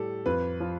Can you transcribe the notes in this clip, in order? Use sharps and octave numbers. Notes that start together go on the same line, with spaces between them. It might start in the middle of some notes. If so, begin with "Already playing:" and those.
Already playing: A2 G3 A4
F2 B4
F3